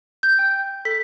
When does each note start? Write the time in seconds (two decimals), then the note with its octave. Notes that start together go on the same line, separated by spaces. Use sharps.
0.23 G6
0.39 G5
0.85 A4 B6